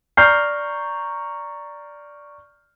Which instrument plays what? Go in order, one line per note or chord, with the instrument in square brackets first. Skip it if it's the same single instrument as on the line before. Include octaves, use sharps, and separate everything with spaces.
[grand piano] D5 A#5 C#6 F6 G6 C7